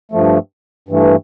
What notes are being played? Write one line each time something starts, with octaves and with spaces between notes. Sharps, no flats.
G2 F3 A3
G2 E3 A3